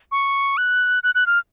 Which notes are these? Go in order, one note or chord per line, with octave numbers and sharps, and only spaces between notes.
C#6
F#6
F#6
F#6
F6